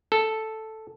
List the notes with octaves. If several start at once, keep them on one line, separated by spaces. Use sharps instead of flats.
A4